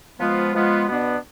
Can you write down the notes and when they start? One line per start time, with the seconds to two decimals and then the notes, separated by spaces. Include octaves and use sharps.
0.20 F3 G#3 B3 F4
0.54 F3 G#3 B3 F4
0.87 B2 B3 D4